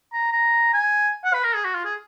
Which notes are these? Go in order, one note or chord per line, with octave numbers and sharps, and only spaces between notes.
A#5
A#5
G#5
F#5
B4
A#4
G#4
F#4
F4
G#4